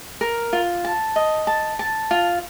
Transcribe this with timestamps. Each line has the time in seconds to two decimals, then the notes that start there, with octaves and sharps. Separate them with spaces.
0.21 A#4
0.53 F4
0.84 A5
1.16 D#5
1.47 A5
1.79 A5
2.11 F4